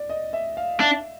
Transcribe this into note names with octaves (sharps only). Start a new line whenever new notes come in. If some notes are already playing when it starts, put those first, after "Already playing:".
Already playing: D5
D#5
E5
F5
D4 E5